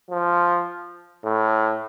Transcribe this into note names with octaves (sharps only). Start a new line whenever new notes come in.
F3
A2